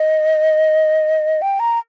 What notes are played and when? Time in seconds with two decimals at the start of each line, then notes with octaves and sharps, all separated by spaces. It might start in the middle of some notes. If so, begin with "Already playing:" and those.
Already playing: D#5
1.42 G5
1.60 A#5